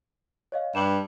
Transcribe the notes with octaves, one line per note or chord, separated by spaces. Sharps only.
C#5 D#5 F5
G2 E7 F#7